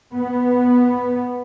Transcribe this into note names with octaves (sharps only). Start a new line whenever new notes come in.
B3